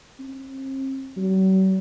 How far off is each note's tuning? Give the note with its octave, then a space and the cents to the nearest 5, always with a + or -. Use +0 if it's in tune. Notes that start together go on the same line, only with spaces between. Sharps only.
C4 +35
F#3 +45